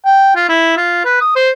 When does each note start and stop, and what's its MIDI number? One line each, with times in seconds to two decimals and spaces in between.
0.05 0.34 79
0.36 0.46 65
0.49 0.77 64
0.77 1.02 65
1.05 1.16 71
1.21 1.36 87
1.36 1.50 72